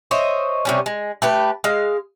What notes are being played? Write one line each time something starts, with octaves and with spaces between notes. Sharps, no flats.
C5 C#5 D#5 E5
C3 G3 C#4
G#3
A3 G4 B4
G#3 F5